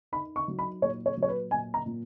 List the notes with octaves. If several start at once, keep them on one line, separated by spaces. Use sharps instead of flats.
D#4 B5
C#6
F#3
B5
A#2 C#5
C#5
F#3
C#5
B4
A#2 G#5
A#5
A#2